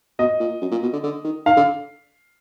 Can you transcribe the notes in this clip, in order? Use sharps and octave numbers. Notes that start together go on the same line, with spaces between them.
B2 D#5
A#2
F#2
A#2
B2
D3
D3
D#3
D#3 F5
D3